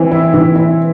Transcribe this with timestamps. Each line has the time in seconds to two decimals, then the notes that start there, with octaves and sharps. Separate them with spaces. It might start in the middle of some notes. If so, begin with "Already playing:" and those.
Already playing: E3 C4
0.11 E4
0.34 E3
0.56 E4